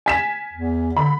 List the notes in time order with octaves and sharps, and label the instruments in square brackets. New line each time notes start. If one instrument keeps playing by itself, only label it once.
[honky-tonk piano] G#5 B6 E7
[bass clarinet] E2
[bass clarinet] D3 [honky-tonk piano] B5